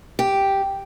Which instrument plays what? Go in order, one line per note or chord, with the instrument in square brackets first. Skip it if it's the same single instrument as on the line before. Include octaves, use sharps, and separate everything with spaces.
[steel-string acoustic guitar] G4